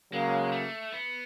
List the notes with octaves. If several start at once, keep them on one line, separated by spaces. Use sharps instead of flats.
C#3 F#3 G#3 A#3
A3
B3